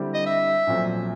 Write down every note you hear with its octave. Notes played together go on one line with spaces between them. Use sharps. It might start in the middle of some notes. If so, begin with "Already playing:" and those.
Already playing: D3 G3 C4 E4 G4
D#5
E5
A#1 A#2 F#3 A3 C4